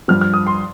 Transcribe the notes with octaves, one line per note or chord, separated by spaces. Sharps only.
G2 F3 F6
F6
D#6
C6